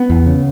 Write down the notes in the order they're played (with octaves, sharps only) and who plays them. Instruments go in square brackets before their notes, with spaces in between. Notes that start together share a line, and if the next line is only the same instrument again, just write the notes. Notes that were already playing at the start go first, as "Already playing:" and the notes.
Already playing: [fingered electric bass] B3
E2
C#3